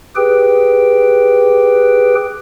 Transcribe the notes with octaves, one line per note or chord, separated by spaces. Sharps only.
G4 G#4 B4 G5